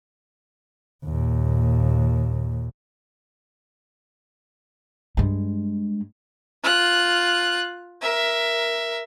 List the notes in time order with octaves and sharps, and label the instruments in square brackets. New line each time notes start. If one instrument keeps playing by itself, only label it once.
[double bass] D#2 A#2
[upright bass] G2 G#3
[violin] F4 F#6
A#4 E5